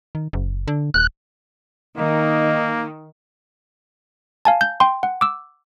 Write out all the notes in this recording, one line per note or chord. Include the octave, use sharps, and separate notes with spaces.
D#3
F#1
D3
D#1 F#6
D#3 A#3 D#4
F5 G#5 A5
G6
G5 C6
F#5
D6 E6